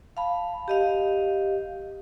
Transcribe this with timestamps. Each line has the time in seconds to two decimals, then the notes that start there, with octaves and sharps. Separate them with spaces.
0.17 F5 A5 B5
0.68 G4 D#5 F5